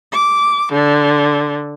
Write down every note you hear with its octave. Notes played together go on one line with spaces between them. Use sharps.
D6
D3